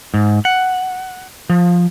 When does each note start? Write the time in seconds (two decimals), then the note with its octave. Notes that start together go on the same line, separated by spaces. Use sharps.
0.14 G#2
0.45 F#5
1.50 F3